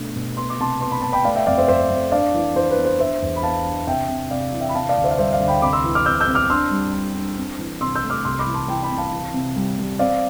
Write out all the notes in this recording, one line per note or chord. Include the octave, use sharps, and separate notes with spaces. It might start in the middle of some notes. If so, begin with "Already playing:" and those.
Already playing: B2 A3 D4
B2
B3 C6
D6
C3 A5 C6
B3 C6
B5
B3 A5
G5 B5
A3 D5 F5
E5 G5
F2 D5 F5
C5 E5
F2 C5 E5
F2
D4 D5 F5
E3
E3 C5
B4
B3
C5
D4 C5 E5
E2
B5
B3 F5 A5
D4
C3 E5 G5
C3
C3 D5 F5
E3
E5 G5
B5
C3 F5 A5
D5 F5
D2
C5 E5
F5
G3 C5 E5
D5 F5
D2
G5 B5
C3 B5 D6
C6 E6
E3
D6 F6
C4 E6 G6
E6 G6
C4
D6 F6
D4 C6 E6
G3
D4
D4
C4
E3
C3 C6 E6
E6 G6
A3
D6 F6
C2 C6 E6
B5 D6
E3
A5 C6
E3 G5 B5
G5 B5
C3
F5 A5
E3
C3
G3
G3
C4 D5 F5